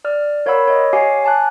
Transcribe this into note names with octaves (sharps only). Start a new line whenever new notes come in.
D5 F6
A#4 C#5 F5 F#5 B5 E6
C#5 D#5
G4 C#5 F5 G#5 D6 C7
G#5 A5 D6 F#6